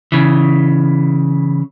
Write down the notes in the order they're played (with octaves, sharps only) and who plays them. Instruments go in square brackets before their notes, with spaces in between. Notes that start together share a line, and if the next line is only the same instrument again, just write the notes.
[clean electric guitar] C#3 E3